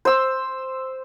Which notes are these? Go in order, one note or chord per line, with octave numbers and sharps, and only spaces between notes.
C5 E6